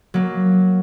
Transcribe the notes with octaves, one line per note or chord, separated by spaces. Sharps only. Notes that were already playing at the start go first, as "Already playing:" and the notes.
F#3 A#3